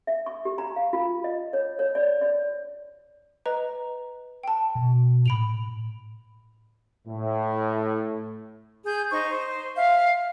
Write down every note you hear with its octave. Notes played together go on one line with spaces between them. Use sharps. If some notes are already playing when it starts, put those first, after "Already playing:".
E5
C#6
G4
A#5
F5
F4
D#5
C#5
C#5
D5
D5
B4 D#5 A#5
G5 A5
B2
A2 B5 D7 F7
A2
G#4 G6
D#4 C5 C#6
C5
E5 F5